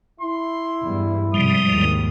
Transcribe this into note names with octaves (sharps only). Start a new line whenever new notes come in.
E4 C6
E2 G2 G3
G#2 C3 F3 G3 D#6
G#1 D#2 G#2